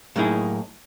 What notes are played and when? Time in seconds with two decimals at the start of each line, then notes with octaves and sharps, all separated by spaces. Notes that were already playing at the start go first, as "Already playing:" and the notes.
0.16 A2 F#3 A#3 D#4 E4 G#4